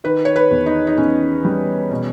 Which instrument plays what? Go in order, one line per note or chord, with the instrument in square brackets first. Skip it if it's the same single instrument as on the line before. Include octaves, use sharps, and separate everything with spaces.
[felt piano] D#3 B4
C#5
B4
E2
D#4
D#4
E2 C#4
G3
B2